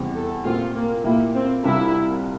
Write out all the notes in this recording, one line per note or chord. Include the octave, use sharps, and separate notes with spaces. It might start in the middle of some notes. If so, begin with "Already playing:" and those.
Already playing: E2 C3 G3 C4 G4
A4
A#2 A3 C4 F4 G4
A#3
A#2 A3 A#3 E4 G4
C4
C2 C3 G3 D4 E4 F4